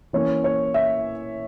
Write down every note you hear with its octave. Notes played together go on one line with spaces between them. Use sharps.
E3 A#3 C#4 C#5
C#5
E5